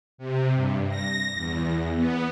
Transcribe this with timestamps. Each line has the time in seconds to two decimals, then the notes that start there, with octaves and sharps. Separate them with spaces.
0.18 C3
0.55 G2
0.89 A#6
1.35 E2
1.97 B3